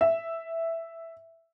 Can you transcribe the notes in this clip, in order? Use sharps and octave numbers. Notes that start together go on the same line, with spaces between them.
E5